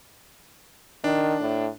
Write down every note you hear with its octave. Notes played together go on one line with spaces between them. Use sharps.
D#3 D4
A2